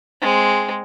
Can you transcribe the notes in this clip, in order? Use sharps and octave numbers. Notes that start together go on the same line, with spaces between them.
G#3 C4